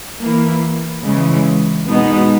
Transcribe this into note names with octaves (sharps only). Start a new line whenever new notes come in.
E3 A#3 E4
C#3 E3 G#3
B2 G#3 B3 D#4